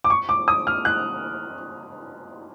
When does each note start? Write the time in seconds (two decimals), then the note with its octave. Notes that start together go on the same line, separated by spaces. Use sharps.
0.04 D6
0.10 C#6
0.29 D6
0.48 D#6
0.67 F6
0.85 F#6